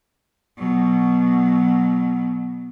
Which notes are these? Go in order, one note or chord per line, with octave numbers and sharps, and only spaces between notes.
B2 F#3